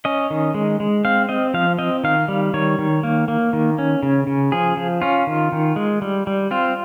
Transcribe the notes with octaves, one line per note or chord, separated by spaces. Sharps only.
C#4 D#5
D#3
G#3
G#3
C4 F5
C4 D#5
F3 F5
C4 D#5
D#3 F5
G3
D#3 C#5
D#3
A#3
A#3
D#3
C#4
C#3
C#3
F3 G#4
F3
C#4 F4
D#3
D#3
G#3
G3
G3
C4 F4